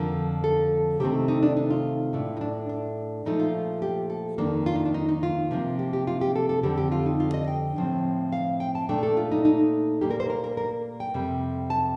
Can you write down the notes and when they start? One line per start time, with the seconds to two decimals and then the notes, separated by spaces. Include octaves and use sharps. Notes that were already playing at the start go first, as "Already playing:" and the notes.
Already playing: F2 D3 F3 A#4
0.44 A4
1.00 C3 D#3 A3 C4 G4
1.28 D#4
1.43 D4
1.57 D#4
1.71 F4
2.13 A2 A3 D4
2.37 D#4
2.41 D4
2.69 D4
3.26 A#2 F3 A3 D#4
3.40 F4
3.82 G4
4.10 A4
4.38 F2 D#3 A#3 D4
4.66 F4
4.76 D#4
4.85 D4
4.94 D#4
5.09 D#4
5.23 F4
5.51 C3 F3 A#3
5.79 G4
5.93 G4
6.07 F4
6.21 G4
6.36 A4
6.49 A4
6.63 F2 D3 G3 C4 G4
6.78 G4
6.92 F4
7.06 D#4
7.20 F4
7.34 D#5
7.48 G5
7.76 A2 F3 C4
8.32 F5
8.60 G5
8.75 A5
8.89 A#2 A3 D4 G5
9.03 A4
9.17 F4
9.32 D#4
9.45 D#4
10.01 A#2 G3 A#3 G4
10.11 A#4
10.20 C5
10.30 A#4
10.44 A#4
10.57 A#4
11.00 G5
11.14 F2 C3 G3
11.70 A5